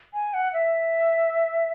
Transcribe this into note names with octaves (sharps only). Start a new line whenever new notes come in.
G#5
F#5
E5